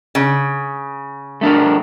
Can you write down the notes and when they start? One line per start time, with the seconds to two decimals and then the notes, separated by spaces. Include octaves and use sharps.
0.15 C#3
1.41 A3 D4 A#4